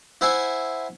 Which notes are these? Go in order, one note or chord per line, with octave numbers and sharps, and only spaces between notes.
E4 C5 E5 F#5 G#5